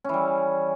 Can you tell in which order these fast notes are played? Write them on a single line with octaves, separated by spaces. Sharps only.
C#4 E3 G3